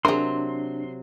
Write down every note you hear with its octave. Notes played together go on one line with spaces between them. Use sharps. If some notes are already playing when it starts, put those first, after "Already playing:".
C3 F#3 D4 G#4 A#4 C6